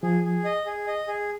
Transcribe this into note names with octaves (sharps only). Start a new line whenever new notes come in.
F3 G#4
G#4
D#5
G#4
D#5
G#4